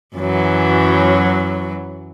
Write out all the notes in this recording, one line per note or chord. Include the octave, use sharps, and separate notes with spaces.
F#2 E3 F#3